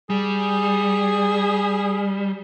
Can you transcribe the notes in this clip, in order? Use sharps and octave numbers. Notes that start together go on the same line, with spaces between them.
G3 G#4